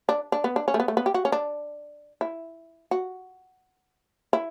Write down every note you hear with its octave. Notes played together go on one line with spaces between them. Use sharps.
D4
D4
B3
D4
C#4
A3
B3
A3
B3
G4
F#4
C#4
D4
E4
F#4
E4